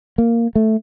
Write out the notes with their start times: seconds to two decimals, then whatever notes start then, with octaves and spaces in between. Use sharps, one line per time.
0.18 A#3
0.55 A3